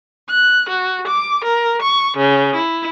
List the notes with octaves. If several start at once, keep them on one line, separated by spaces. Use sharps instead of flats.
F#6
F#4
D6
A#4
C#6
C#3
E4